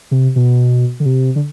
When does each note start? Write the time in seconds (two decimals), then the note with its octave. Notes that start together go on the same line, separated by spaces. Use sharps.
0.11 C3
0.36 B2
1.00 D3
1.05 C3
1.36 D3